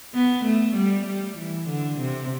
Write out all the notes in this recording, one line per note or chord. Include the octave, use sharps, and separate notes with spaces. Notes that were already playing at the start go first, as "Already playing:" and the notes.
B3
A3
G3
G3
E3
D3
C3